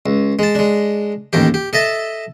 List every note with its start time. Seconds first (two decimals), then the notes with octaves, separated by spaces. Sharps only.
0.06 C#2
0.39 G#3 A5
0.55 G#3 D4
1.33 A1 D#2 D#3 G4
1.54 G4
1.73 A4 D#5 E5 A5